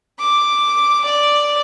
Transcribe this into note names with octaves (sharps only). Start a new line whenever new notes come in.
D6
D5